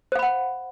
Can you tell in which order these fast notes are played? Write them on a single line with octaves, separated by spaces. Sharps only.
C5 F5 B5 F#5